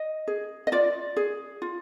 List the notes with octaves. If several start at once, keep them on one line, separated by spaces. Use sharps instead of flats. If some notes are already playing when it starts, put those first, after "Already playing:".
Already playing: D#5
G#4
D#5
F4 D5
G#4
F4